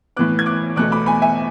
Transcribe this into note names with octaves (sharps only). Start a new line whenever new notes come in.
A2 E3 B3 D6 F#6
G#6
D6 F#6
E2 B2 A3 D6 F#6
B5 D6
G#5 B5
E5 G#5